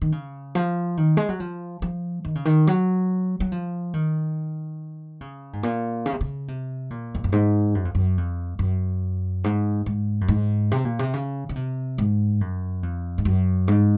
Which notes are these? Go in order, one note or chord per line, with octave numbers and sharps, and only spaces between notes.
D#3
C#3
F3
D#3
G#3
F#3
F3
F3
D#3
C#3
D#3
F#3
F#3
F3
D#3
C#3
G#2
A#2
C#3
C3
C#3
C3
A#2
F2
F#2
G#2
F#2
F2
F#2
F2
F#2
G#2
G#2
F#2
G#2
C3
A#2
C3
C#3
C#3
C3
G#2
F#2
F2
G#2
F#2
G#2